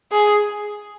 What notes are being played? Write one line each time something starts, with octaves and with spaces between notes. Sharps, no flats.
G#4